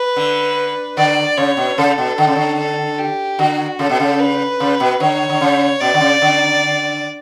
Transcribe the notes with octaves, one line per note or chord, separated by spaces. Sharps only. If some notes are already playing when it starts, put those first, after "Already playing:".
Already playing: B4
D3
D3 D5
C#3 C#5
B2
C#3 A4
B2
D3
C#3
D3
A4
G4
D3 F#4
C#3 A4
B2
C#3
B4
C#3
B2
D3 C#5
D3
C#3
B2 D5
D3
C#3
D3